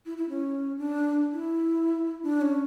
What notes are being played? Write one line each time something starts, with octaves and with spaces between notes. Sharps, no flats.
E4
E4
C#4
D4
E4
D4
C#4